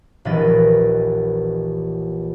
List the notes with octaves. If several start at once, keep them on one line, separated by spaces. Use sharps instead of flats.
D#1 A#1 E3 B4 D#5 A6